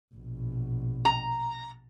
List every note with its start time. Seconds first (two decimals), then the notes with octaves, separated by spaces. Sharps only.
0.15 A#1 B2
1.05 A#5